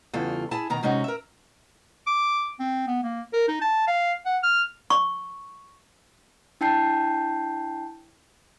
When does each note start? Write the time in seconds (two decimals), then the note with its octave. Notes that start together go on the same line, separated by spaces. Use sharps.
0.13 E2 C#3 G3 F4 A4
0.51 E4 G#4 A5
0.70 B2 D#3 A#5
0.83 C3 G#3 C#4 D#4 F#4
1.04 A#4 E5
2.07 D6
2.60 C4
2.87 B3
3.03 A#3
3.33 A#4
3.48 D#4
3.61 A5
3.87 F5
4.26 F#5
4.43 F6
4.90 C#6
6.61 D4 E4 G5 A5 G6 C7